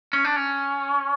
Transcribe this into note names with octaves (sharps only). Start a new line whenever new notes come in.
C#4
D4
C#4